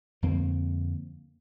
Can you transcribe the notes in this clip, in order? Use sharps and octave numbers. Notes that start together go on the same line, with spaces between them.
F2 D3 A#3 C4